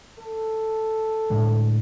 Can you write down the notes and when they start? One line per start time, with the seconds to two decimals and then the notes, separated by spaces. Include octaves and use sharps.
0.19 A4
1.30 A2 D3 G#3